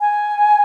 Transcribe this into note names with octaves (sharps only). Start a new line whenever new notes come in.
G#5